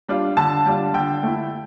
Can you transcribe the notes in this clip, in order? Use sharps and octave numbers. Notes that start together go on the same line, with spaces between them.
G3 D4 F4
D3 A5
G3 D4 F4
D3 G5
A3 E4